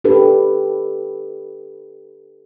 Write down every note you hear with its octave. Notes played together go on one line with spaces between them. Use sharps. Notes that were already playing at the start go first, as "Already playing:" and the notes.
D4 G4 A4 B4